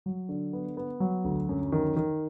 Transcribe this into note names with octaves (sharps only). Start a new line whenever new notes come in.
F#3
D3
B3
B3
F#3
D2
F#2
D#3
D#3